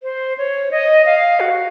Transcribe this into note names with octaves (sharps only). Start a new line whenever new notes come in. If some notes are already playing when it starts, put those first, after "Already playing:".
C5
C#5
D#5
F5
F#4